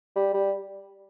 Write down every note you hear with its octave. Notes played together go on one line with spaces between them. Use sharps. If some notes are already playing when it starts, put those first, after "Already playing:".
G3
G3